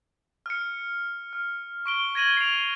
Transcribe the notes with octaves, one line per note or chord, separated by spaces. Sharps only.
F6 C#7
F6
C#6 D7 G7
G#6 A#6 D#7 F#7 G7
C7 D7 F7